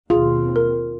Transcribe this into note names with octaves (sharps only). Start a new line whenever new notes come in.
D#2 B2 C4 F4 G#4
A#4